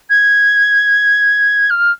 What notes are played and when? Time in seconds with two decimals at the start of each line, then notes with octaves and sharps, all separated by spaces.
0.10 G#6
1.70 F6